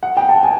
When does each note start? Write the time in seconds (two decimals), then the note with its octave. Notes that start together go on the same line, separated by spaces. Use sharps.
0.03 F#5
0.17 G5
0.29 A5
0.43 G#5